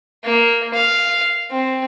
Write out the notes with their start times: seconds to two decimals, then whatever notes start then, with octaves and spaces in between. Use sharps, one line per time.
0.24 A#3
0.74 F5
1.51 C4